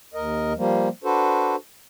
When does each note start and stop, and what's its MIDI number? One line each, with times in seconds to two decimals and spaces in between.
0.14 0.53 39
0.14 0.53 70
0.14 0.53 75
0.57 0.89 53
0.57 0.89 55
0.57 0.89 58
1.04 1.56 62
1.04 1.56 66
1.04 1.56 69
1.04 1.56 71
1.04 1.56 72